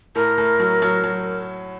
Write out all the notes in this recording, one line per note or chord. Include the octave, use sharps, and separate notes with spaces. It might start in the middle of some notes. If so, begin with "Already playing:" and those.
A2 A#4
A2
F#3
F#3
F#3